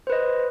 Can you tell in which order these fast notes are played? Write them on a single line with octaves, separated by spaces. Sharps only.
C5 B4 D#5